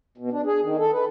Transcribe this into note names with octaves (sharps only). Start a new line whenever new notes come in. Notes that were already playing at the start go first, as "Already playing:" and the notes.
B2
D4
G#4
D#3
A4
B4